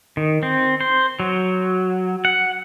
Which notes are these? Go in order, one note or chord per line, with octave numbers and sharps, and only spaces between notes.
D#3
C4
C5
F#3
F#5